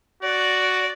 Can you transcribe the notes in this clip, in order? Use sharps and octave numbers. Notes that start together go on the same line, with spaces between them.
F#4 D5